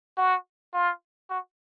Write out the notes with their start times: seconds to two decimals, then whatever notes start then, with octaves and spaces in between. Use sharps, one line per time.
0.17 F#4
0.73 F4
1.30 F#4